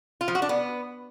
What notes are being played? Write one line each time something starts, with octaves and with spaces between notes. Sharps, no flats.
F4
F3
F#4
D4
B3